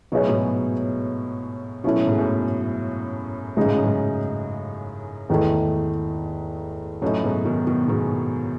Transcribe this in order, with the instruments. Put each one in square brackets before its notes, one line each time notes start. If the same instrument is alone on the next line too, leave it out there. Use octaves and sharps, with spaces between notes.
[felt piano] B2 [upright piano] F#3 B3 D#4 G#4 C#5
[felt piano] A2
G#2 B2
[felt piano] B2 [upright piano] F#3 C#4 E4 A4
[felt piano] A2
G#2
F#2 A2
[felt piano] A2 [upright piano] C#3 G#3 D#4 G#4
[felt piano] G#2
F#2
G#2
[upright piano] E2 D#3 A3 [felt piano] G#2
[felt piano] F#2 A2 [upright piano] F#3 A3 D#4
[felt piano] G#2 B2
B2 D#3
B2 D#3
G#2 B2